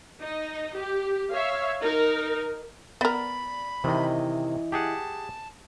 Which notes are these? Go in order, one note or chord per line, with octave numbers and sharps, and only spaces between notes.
D#4 D#5
G4
C#5 E5 F5
D#4 A#4
B3 A#4 D5 B5
C3 D#3 E3 D#5
G4 G#4 F#5 A5